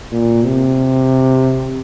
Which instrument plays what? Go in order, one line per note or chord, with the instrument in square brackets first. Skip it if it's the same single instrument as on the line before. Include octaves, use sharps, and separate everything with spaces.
[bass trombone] A#2
C3